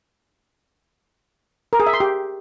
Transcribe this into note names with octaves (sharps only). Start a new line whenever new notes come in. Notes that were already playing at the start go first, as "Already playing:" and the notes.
A#4
G#4
E5
C6
G4